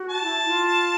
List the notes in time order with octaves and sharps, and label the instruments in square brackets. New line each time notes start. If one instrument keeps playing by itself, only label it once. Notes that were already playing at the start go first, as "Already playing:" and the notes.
Already playing: [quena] F#4
[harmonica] A5
[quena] E4
F4